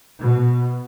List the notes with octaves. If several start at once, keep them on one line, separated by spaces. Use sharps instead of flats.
B2